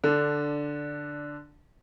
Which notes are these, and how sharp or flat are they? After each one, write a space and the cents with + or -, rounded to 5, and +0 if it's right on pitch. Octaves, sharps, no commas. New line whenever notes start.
D3 +0 D4 -5